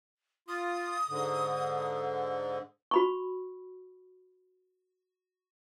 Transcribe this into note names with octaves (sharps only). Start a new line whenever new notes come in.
F4 D#6
G#2 D3
F#4 B5 C#6